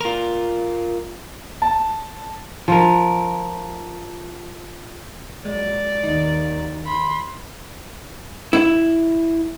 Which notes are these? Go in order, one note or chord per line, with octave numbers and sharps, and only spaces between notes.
F4 A#4
A5
F3 A#4
A#1 F#3 G#3 D5
D#2 D#3 D#4
B5 C6
E4